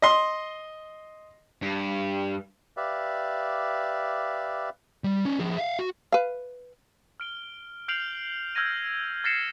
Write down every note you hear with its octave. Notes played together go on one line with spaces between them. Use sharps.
D#5 C6
G2
G4 B4 D5 E5 F5
G3
C#4 D5
F3 G#4
E5 F5
F#4
B4 F5
F6 D7 G7
F6 G6 C7 D7 F7 F#7
E6 F6 G6 G#6 A#6 D#7
F6 A6 A#6 C7 C#7 E7